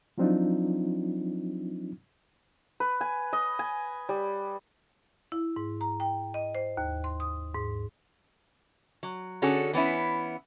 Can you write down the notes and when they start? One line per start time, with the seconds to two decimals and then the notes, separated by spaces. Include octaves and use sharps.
0.18 F3 F#3 C4 D4 D#4 F4
2.80 B4
3.01 G#5
3.33 D#5
3.59 G#5
4.09 G3
5.32 E4
5.56 G#2
5.81 A#5
6.00 G5
6.34 D#5
6.55 C5
6.77 D#2
7.04 C6
7.20 D#6
7.54 G#2
9.03 F#3
9.42 D3 C#4 F#4 G#4 A4
9.73 E3 B3 C#4 E4